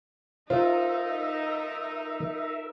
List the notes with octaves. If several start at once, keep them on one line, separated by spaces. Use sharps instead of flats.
D#4 F4 A#4 C5 E5